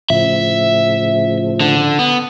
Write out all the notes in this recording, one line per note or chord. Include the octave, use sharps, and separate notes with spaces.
A2 C#3 F3 E5
D3
B3